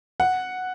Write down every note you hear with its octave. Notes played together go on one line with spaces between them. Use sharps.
F#5